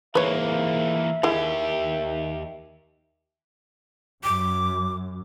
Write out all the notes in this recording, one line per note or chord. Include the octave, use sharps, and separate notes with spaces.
G#2 E3 A#3 B4 C#5 E5
D#2 D#3 E4 G4 G#4
F#2 D6